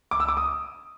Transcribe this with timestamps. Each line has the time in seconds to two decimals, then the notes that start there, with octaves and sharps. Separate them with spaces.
0.11 D6
0.20 E6
0.29 D6
0.37 D#6